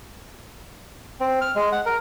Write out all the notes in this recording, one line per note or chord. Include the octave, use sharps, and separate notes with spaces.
C4
F6
G#3
F#5
A#4